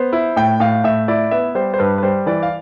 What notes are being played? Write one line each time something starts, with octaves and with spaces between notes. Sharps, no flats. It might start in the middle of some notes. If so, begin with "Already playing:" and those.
Already playing: B3 C5
E4
A2 G5
A2 F5
A2 E5
E4 D5
B3 E5
G3 C5
C5
G2 B4
B4
G3 C5
E3 D5
F5